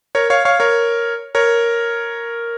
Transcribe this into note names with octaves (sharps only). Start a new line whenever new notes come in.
A#4 C#5
C#5 F5
C#5 F5
A#4 C#5
A#4 C#5